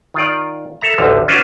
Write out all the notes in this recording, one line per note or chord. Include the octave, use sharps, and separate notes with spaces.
D#3 F4 D5
A4 E5 A#5
A1 D2 D3 F3
C#4 D4 F4 F#4 B4 C5